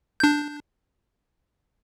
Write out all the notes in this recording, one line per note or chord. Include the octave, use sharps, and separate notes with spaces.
D4 G6